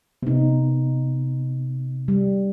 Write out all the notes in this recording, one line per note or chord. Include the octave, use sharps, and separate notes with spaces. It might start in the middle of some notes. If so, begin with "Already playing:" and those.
C3 B3 D#4
G3